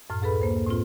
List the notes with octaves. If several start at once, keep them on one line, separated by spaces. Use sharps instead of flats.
F#2 A2 F6
D2 G#4 A4 B4 B5
A#3 C5
A2 C4 F4